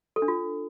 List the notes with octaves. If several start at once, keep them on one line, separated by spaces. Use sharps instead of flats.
A4
D4
F4